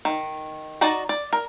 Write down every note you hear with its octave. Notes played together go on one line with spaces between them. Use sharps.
D#3
D#4 F#4 D5 A5 A#5
D5
A#4